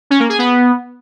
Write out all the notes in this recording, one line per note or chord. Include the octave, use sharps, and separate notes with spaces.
C#4
A#3
G#4
B3